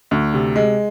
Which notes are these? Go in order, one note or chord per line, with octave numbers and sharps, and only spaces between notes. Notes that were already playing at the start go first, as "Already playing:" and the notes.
D2
C3
G#3